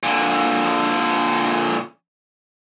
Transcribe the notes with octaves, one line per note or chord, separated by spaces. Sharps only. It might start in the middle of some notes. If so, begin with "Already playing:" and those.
A#2 D3